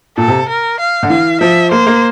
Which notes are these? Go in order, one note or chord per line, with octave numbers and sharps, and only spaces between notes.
A#2 A4
C3
A#4
F5
D3
E3 F5
F3 E5
A#3 C5
A#3